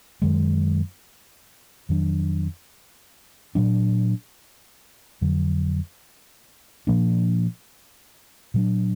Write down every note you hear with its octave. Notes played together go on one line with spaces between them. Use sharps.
F#2 D#3 G#3
F2 D#3 F#3 D4
A#2 F#3 D4
F2 D3 F#3
A#2 F3 A#3 D4
A#2 F#3 D4